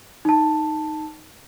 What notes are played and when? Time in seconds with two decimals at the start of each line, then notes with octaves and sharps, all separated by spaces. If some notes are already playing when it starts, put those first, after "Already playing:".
0.25 D#4 A5